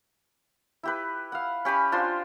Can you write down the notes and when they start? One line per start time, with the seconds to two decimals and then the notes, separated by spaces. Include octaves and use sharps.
0.83 E4 G4 B4
1.32 F5 F#5
1.65 C#4 G4 G#5 B5
1.92 D4 F4 C5 C6